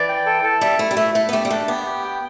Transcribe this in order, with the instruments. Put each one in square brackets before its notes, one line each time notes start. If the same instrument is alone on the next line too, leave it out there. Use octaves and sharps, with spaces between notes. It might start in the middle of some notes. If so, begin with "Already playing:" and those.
Already playing: [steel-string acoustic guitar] E3 [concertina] D5
[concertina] G5
A4
A4
[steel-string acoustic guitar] G3 [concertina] E5
[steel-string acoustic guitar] A3 [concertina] E4
[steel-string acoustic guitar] G3
[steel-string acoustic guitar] A3 [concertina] E5
[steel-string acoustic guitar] A3 [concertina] E5
[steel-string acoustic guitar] B3
[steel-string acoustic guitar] A3 [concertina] G4
[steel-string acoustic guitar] G3
[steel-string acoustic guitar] A3 [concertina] D4
[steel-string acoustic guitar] B3 [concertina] G4
[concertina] G4
G5